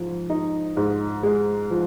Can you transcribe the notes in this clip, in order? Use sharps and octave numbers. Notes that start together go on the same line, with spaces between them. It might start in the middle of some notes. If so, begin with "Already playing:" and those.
Already playing: G#2 F3
D#4
G#2
G#3
F3